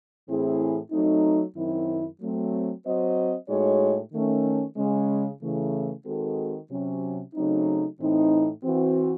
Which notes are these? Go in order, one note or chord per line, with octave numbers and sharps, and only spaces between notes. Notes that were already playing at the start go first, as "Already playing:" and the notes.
A2 E3 C4 E4 G#4
F#3 A3 C4 D#4
F#2 D#3 F#3 C4 E4
F#3 A3 C4
F#3 C4 F#4 C5 D#5
A2 G#3 D#4 F#4 C#5
D#3 A3 C#4
C#3 G#3 C#4
C#3 E3 A3
D#3 G#3 C4 F#4 A4
C3 F#3 C#4
C#3 F#3 A3 C4 D#4
A2 E3 C4 D#4
E3 C4 F#4